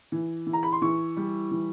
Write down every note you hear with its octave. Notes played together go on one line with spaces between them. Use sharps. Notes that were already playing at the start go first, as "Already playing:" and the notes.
E3
E3
A#5
B5
C6
E3 C#6
G3
E3